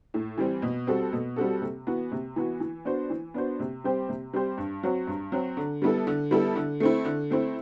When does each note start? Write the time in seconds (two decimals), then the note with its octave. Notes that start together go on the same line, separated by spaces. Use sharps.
0.14 A2
0.38 E3 G3 C4
0.62 B2
0.87 G3 C4 F#4 A4
1.12 B2
1.36 G3 C4 F#4 A4
1.62 C3
1.87 E3 B3 F#4
2.12 C3
2.36 E3 B3 F#4
2.60 E3
2.85 B3 D4 F#4 C5
3.10 E3
3.34 B3 D4 F#4 C5
3.59 C3
3.84 G3 C4 G4 C5
4.09 C3
4.33 G3 C4 G4 C5
4.58 G2
4.83 F#3 C4 F#4
5.07 G2
5.32 F#3 C4 F#4
5.57 D3
5.82 G3 B3 E4 A4
6.07 D3
6.31 G3 B3 E4 A4
6.56 D3
6.80 A3 C4 E4
7.05 D3
7.31 A3 C4 E4